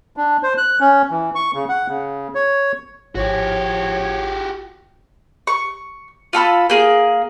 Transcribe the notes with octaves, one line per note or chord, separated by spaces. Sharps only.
D4
C5
F#6
C#4
E3
C#6
C#3
F#5
C#3
C#5
G#1 A2 F3 F#4 G4 C#5
C#6
F4 A4 B5 E6
A#3 G#4